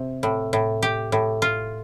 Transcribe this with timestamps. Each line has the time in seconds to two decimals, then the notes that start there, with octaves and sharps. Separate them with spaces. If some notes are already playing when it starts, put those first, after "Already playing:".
Already playing: C3
0.23 A2
0.53 A2
0.82 G4
1.12 A2
1.42 F4